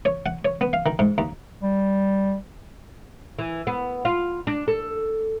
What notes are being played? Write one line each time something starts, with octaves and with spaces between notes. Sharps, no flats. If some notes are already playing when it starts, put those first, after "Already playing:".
C#5
F#5
C#5
B3
F5
D#3
G#2
D#2
G3
E3
B3
F4
D4
A4